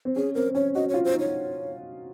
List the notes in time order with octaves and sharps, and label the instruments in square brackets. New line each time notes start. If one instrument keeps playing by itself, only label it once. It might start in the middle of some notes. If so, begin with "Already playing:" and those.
[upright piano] C4
[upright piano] C#4 [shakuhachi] G#4
[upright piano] C4 [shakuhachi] A#4
[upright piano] C#4 [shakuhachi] C#5
[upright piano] F#4 [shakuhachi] D#5
[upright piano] F4 [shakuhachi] C#5
[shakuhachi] C5
[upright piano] D#4
[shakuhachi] C#5